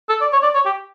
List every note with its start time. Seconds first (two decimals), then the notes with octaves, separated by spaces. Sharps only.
0.09 A4
0.21 D5
0.33 C#5
0.43 D5
0.55 C#5
0.66 G4